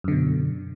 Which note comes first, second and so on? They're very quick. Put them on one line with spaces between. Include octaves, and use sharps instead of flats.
F#2 D3 B2